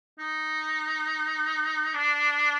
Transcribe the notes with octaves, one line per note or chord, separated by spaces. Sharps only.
D#4
D4